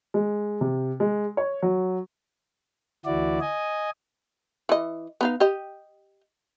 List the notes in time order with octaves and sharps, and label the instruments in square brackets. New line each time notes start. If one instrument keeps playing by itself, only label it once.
[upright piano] G#3
C3
G#3
C#5
F#3
[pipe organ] D2 E3 E4 F#4 D5
D#5 G#5
[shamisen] E3 D#5
B3 D#4 F5
G4 D#5